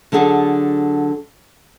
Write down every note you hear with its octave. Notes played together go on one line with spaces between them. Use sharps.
D3 F#3 D4 G#4 A4